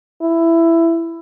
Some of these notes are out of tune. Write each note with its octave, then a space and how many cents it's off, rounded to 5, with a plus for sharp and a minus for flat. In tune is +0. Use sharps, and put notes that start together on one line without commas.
E4 +10